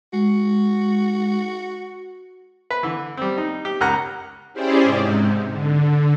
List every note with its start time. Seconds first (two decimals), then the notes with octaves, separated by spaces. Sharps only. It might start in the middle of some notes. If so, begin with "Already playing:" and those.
0.13 G#3 F#4
2.71 B4
2.83 D3 E3
3.17 G3 C4
3.38 D#4
3.65 G4
3.81 C#2 A#4 F#5 A#5 F#6
4.53 C#4 E4 G4 G#4 C5 D5
4.83 G#2 C3
5.49 D3